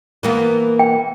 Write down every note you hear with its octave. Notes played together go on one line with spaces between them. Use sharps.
E3 A#3 B3
G5